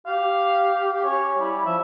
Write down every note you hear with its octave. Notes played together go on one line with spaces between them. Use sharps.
G4 F5
C#4 C#5
G3 E4
F3 E5